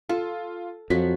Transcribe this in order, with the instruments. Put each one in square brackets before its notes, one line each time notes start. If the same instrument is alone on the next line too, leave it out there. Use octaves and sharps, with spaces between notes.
[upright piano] F4 [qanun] A4
[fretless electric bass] F2 [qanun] F3 F#3 F#4 [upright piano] B6